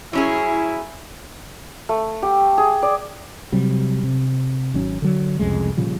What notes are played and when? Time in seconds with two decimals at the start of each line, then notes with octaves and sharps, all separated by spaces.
0.13 F#3 C#4 E4 G#4
1.89 A3
2.22 G4
2.58 G#4
2.82 D5
3.52 C3 F#3 G3
4.04 C3
4.74 G#1 F#3 C#4
5.02 D3 F#3
5.39 C2 F2 C#3 G#3
5.77 A#2 C#3 F3 G3